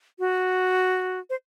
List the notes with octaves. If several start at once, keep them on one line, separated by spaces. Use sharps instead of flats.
F#4
C5